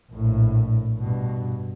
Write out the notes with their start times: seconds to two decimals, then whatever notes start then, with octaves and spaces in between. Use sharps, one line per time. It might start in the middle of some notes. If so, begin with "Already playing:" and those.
0.12 A#1 A2
0.98 G2 B2